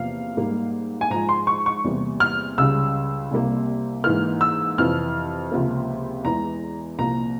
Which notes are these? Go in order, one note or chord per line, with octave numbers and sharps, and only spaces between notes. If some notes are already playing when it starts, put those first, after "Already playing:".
Already playing: E2 C3 F3 A#3 F5
G#2 G3 A#3
G#5
G#2 F3 G#3 A#5
C6
C#6
C#6
E2 C3 G3 A#3
F6
C#2 C#3 G3 E6
C2 C3 G3 A#3
G#2 E3 A#3 F6
E6
F2 C3 E3 F6
C#2 C3 F3 A#3
E2 E3 G#3 A#5
C2 A#2 F3 A#3 A#5